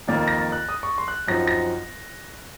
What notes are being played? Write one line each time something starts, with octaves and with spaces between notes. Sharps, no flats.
F2 D#3 A#3 D#4 A6
A6
A#6
A6
F#6
D#6
C#6
C6
F#6
F#2 F3 C4 D#4 A#6
A#6